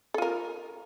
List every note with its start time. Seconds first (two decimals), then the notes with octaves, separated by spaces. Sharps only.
0.14 A4
0.18 F4
0.22 A#4